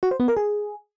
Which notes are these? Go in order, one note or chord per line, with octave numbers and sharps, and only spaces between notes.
F#4
C5
B3
A#4
G#4